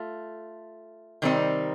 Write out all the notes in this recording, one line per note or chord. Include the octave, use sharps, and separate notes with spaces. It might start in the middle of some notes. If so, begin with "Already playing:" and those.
Already playing: A3 F4
C3 D#3 G3 C4 D#4